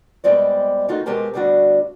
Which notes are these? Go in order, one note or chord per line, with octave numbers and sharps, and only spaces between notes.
B2 G3 G#3 C4 D5
D#3 A3 D#4 F4 F#4
B2 G#3 C4 G4 A#4 A5
D2 B2 G3 D4 F#4 F5